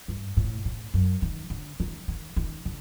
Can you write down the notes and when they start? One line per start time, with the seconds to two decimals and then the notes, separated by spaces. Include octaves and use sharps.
0.08 G2
0.37 A2
0.65 A2
0.94 F#2
1.22 D#3
1.50 D3
1.80 D#3
2.08 D#3
2.37 D#3
2.65 D3